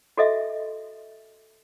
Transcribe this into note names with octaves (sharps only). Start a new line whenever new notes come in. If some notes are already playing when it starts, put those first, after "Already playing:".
F#4 A4 D#5 E5